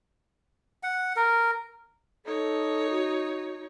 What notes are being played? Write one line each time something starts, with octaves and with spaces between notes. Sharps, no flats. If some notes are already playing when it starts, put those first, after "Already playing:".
F#5
A#4
D#4 A4 C#5
F#4